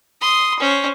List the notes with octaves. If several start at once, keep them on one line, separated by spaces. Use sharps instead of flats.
C6 D#6
C#4 C5